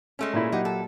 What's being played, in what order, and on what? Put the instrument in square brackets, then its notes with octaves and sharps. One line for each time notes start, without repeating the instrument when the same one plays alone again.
[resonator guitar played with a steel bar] G#3 A3 C#4
[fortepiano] A#2 E4
[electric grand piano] F#3 G4 F#5 [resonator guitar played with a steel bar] D#4
[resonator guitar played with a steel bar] A4